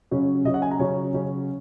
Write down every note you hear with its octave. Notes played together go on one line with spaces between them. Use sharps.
C#3 F#3 C#4
C#3 F#3 C#4 D#5
F#5
G#5
A#5
C#3 F#3 C#4 C#5
C#3 F#3 C#4